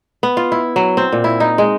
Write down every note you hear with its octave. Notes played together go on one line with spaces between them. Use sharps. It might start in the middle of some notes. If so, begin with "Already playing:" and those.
B3
F4
E4
F#3
C4
A#2
E4
D#4
G#3